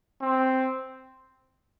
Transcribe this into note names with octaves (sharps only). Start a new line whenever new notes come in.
C4